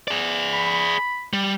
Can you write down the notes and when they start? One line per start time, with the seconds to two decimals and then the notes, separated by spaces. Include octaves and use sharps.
0.08 G#4 D5
0.53 B5
1.33 G3